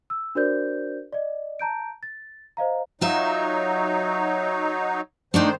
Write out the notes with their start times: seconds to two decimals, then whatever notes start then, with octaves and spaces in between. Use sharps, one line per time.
0.10 E6
0.35 D4 F#4 A#4 C5 D5 G6
1.13 D5 D#5
1.59 A5 A#5 G6 D7
2.03 A6
2.57 C5 D#5 F5 A#5
3.01 F#3 D#4 F4 E5
5.34 D#3 A3 D4 D#4 C5